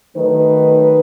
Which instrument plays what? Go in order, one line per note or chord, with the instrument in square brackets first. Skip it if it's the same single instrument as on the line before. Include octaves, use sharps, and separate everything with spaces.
[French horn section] D#3 F#3 A3 D#4 B4